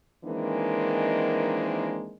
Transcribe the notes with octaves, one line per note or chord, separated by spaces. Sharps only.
D#3 E3 G#3 A#3 C4 D4